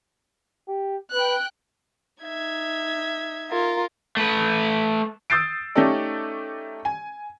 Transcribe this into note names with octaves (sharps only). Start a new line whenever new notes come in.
G4
B4 G5 F#6
D#4 E5 G#6
F4 A#4
A3 B4
D#6 E6 G6 A6 C7 D7
A3 C#4 D#4 G4 A4 D5
G#5